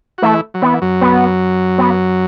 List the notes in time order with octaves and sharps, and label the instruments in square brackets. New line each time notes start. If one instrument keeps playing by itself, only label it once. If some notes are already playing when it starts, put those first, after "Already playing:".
[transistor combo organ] F#4
[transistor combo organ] E3 E4 [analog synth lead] A3
[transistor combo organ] F#3
[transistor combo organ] E3 [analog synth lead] B3
[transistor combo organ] F#2 F#3
[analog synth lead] B3
B3